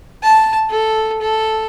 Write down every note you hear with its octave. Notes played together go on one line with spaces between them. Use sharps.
A5
A4
A4